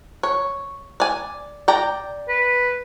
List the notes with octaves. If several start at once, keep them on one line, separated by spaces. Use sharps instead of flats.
C#5
D5 G#5
D5 G5 A#5
B4